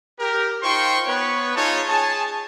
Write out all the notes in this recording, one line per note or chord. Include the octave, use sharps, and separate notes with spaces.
G4 A#4
D#4 F4 C5 G5 C6 C#6
B3 B4 C#5
D#4 F4 G#4 C#5 A5
G#4 C#5 G#5 A5